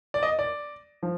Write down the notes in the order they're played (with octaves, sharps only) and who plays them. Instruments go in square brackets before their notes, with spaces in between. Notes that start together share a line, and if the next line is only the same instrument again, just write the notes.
[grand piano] D5
D#5
D5
F3